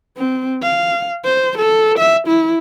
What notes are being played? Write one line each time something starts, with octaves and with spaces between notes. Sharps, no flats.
C4
F5
C5
A4
E5
E4